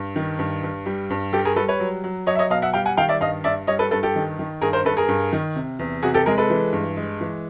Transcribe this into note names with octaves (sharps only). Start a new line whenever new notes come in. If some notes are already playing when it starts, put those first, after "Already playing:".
Already playing: G2
D#3
G2
G2
G3
G2
G3 G4 A4
G#4 A#4
G3 A4 B4
B4 C#5
F#3
F#3
F#3 C#5 D#5
E5
C#5 D#5
B2 D#5 F5
E5 F#5
G3 F5 G5
F#5 G#5
D#3 F5 G5
D5 E5
G2 D#5 F5
G2 D5 E5
G3 C#5 D#5
A4 B4
G2 A4 B4
G4 A4
D#3
D#3
G2 G#4 A#4
A#4 C5
G2 A4 B4
G#4 A#4
G2
D#3
C3
E2
C3 F#4 G#4
G4 A4
G#3 G#4 A#4
A4 B4
E3
G2
G#3
E3